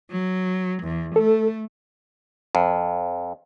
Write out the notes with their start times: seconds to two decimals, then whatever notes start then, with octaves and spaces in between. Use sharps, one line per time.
0.10 F#3
0.83 E2
1.16 A3 A4
2.55 F2